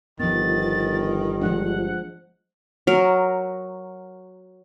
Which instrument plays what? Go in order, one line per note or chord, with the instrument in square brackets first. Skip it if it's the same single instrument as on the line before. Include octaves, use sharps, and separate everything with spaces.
[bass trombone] G1 [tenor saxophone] D#3 [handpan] F3 B3 [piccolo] A6
[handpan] F3 G#3 D4 [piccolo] F#5
[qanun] F#3 A#4